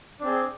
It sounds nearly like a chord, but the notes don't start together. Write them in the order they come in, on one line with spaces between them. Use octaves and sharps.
D4 C4 G#4